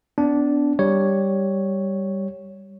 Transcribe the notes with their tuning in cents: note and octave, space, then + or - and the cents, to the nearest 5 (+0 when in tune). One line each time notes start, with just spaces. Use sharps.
B3 +35 D4 -10
G3 +0 C#5 +0